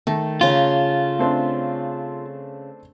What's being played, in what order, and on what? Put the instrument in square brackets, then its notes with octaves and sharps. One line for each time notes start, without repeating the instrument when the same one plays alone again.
[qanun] D#3 [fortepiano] A3
[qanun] C#3 A#5 D6 [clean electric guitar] F4
[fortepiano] A3 C4 D4